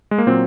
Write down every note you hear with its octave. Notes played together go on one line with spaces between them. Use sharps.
G#3
A#3
A#2 F#3 C4